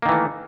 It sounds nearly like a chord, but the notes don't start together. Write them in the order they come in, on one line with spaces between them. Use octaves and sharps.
A#3 D#3 E3 A3